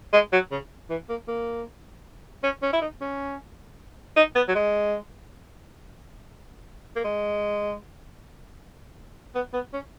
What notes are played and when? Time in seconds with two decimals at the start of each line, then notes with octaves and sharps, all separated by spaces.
0.13 G#3
0.32 F#3
0.51 C#3
0.90 E3
1.09 A#3
1.28 A#3
2.44 C#4
2.63 C#4
2.73 E4
2.81 D#4
3.01 C#4
4.17 D#4
4.36 B3
4.48 F#3
4.55 G#3
6.96 A#3
7.04 G#3
9.35 B3
9.53 B3
9.73 C#4